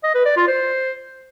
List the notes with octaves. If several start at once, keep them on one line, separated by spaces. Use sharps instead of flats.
D#5
B4
D5
F4
C5